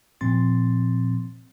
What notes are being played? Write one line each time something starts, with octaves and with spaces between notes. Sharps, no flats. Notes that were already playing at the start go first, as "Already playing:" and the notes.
A#2 F3 C4 C6 A6